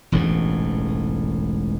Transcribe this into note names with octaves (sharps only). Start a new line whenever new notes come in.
E1 A1 E2 G#2